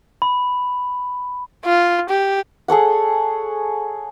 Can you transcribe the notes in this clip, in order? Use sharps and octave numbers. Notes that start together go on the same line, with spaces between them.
B5
F4
G4
G#4 A4 C#5 F#5